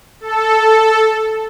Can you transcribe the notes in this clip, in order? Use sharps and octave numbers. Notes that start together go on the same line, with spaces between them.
A4